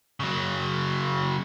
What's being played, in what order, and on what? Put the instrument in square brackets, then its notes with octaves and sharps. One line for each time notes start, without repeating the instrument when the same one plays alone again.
[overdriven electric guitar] C#3 F#3